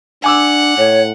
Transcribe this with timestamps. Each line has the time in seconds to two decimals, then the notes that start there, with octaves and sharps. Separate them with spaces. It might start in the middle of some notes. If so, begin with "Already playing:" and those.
0.24 D4 F#5 G#5 D6 E6
0.78 A2 C#5